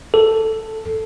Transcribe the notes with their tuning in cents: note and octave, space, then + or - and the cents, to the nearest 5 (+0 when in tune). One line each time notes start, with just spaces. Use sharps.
A4 +5